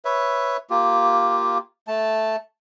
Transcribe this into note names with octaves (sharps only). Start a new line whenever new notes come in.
B4 C#5 E5
A#3 F4 G4
A3 A5